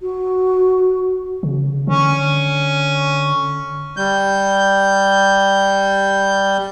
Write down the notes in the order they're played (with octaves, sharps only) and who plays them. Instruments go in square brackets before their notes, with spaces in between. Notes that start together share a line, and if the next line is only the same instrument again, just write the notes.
[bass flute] F#4
[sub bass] C#3
[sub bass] D3 [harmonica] C#4
[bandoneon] G3 G6